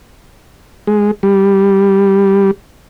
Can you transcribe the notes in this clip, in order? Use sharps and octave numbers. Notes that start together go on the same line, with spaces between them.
G#3
G3